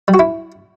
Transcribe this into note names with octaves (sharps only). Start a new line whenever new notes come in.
G3
F#4
E4